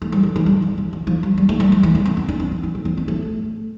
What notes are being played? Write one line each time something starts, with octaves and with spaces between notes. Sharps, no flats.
A3
G3
D3
E3
G3
F3
E3
D3
F3
G3
G3
A3
G3
G3
E3
D3
C4
B3
D4
C4
C4
E3
C4
C4
C4
A3